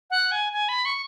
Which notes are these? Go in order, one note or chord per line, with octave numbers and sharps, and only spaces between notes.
F#5
G#5
G#5
B5
C#6